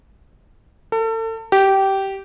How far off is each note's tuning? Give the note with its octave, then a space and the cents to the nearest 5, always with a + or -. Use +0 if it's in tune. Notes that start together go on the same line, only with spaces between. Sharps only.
A4 +35
G4 -15